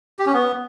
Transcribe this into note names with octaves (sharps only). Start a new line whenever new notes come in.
G4
C#4
B3